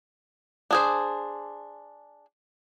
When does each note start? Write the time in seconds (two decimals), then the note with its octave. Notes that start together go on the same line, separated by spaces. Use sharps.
0.71 D4 G#4 C5